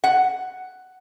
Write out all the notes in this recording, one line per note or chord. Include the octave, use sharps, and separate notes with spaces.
F#5